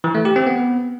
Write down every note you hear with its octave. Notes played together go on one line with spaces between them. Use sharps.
E3
A3
G4
C4
B3